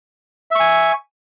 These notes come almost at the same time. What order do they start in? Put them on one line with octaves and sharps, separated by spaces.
E5 C#6 G#5